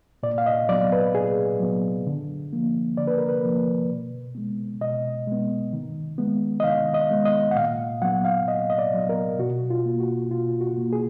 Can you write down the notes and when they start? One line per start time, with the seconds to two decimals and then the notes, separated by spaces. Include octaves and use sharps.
0.23 A#2 D5
0.38 F5
0.46 D#5
0.69 F#3 D5
0.72 B3
0.92 B4
1.15 A#2 G#4
1.60 F#3 B3
2.07 D3
2.53 F3 A#3
2.97 D3 D5
3.07 B4
3.18 A#4
3.29 B4
3.43 F3 A#3
3.90 B2
4.35 G#3 B3
4.81 B2 D#5
5.27 G#3 B3
5.73 D#3
6.18 G#3 B3
6.60 D#5
6.64 D#3 F5
6.94 D#5
7.10 G#3 B3
7.25 D#5
7.51 F#5
7.55 A#2 F5
8.02 F#3 B3 F#5
8.25 F5
8.48 A#2 D#5
8.70 D#5
8.78 D5
8.94 F#3 B3
9.09 A#4
9.39 B2 F#4
9.70 F4
9.85 A#3
10.00 F#4
10.31 B2 F4
10.61 F#4
10.77 A#3
10.93 G#4